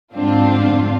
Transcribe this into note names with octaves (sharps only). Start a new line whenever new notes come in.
F2 G#2 D3 C4 D4 F4